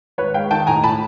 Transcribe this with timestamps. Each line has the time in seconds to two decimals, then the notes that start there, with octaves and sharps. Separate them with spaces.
0.18 G#1 B4 C#5
0.34 G#3 F5 G5
0.51 D#3 G5 A5
0.67 A2 G#5 A#5
0.84 A2 A5 B5